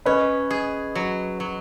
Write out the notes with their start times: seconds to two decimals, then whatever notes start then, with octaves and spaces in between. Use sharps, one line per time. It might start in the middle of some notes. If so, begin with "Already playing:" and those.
0.05 C#4 B4 D#5
0.51 G#4
0.95 F#3
1.40 F#3